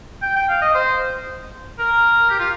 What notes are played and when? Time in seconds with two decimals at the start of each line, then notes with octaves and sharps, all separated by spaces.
0.22 G5
0.36 G5
0.49 F5
0.62 D#5
0.74 C5
1.79 A#4
2.30 G4
2.39 F4